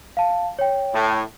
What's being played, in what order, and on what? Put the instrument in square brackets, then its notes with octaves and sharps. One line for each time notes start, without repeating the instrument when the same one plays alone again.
[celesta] F5 A5
C#5 G5
[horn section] A2